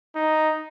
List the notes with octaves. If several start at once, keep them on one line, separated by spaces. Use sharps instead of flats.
D#4